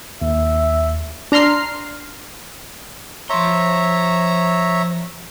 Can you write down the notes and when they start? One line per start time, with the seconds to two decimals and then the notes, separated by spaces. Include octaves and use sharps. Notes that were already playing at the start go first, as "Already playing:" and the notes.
0.22 D#2 E5
1.32 D4 A#5 C6 F6 C7
3.30 F3 C#5 E5 A#5 C6